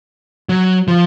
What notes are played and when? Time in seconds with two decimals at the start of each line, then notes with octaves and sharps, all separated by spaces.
0.49 F#3
0.88 F3